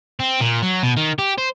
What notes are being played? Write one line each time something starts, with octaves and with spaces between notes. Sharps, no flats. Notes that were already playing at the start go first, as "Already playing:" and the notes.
C4
A#2
F#3
B2
D#3
G4
C5